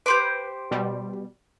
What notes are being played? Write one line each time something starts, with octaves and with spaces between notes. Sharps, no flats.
G4 B4 C5 D6
B2 G3